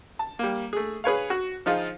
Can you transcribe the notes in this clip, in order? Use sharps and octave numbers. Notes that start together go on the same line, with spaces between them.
A5
G3 A#3
A3 G#4
G#4 B4 C#5 F5
F#4
F3 D#4 F4 G#4